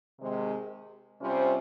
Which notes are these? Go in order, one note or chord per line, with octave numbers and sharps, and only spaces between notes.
C3 D#3 G#3
C3 G3 C#4 F4 C5